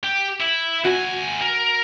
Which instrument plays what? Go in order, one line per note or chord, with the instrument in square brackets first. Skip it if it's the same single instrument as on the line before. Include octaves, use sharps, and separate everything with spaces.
[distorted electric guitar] G4
E4
[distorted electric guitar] D2 G#5 [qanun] F#4
[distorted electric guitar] A#4